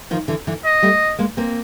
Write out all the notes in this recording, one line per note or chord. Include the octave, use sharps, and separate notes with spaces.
D#3 F3
D3 E3
D3 E3
D#5
G3 A3
G#3 A#3
A#3 C4